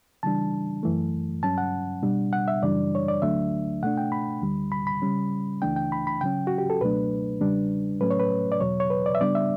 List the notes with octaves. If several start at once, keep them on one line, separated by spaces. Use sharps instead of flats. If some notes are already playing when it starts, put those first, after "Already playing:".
C#3 E3 G3 D4 A5
F#2 E3 A3
G2 F#3 C#4 A5
F#5
B2 G3 D4
F#5
E5
F#2 C#3 E3 G3 D4 D5
C#5
D5
D2 D3 F#3 A3 D4 E5
B2 A3 D4 F#5
G5
B5
D2 D3 G3
B5
B5
C#3 G3 C#4
C#2 C#3 E3 A3 D4 G5
G5
B5
B5
C#3 F#3 C#4 G5
F#4
G4
A4
C#2 B2 F#3 A3 D4 B4
E2 C#3 G3 D4
A2 F#3 A3 C#4 B4
C#5
B4
D5
E2 B2 F#3 C#5
C#5
B4
D5
E5
C#3 G3 B3 D4 D5
E5